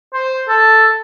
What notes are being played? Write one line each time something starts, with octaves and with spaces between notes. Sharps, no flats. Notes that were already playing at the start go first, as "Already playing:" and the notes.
C5
A4